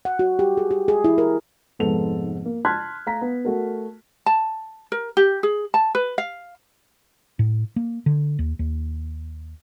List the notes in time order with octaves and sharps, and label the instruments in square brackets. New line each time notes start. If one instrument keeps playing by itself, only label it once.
[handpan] F#5
F#4
G4
G#4
G4
G#4
E4
A#4
[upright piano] F1 G#2 G#3 B3 A4 F7
A#3
A5 C6 F6 F#6 G#6 B6
A3 F5 A#5 B6
B3
A3 F#4 A#4
[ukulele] A5
A#4
G4
G#4
A5
B4
F5
[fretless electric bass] A2
A#3
D3
D#2
D#2